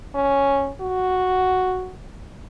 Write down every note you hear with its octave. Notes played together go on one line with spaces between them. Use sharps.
C#4
F#4